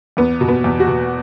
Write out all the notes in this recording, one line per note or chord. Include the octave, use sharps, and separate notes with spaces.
E2 B3
B2
B3
E2
F#4
B2